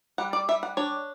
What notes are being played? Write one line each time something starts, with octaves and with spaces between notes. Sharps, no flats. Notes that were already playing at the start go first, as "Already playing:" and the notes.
G3 F#5
D5
G3 E5
F#5
D4 C#5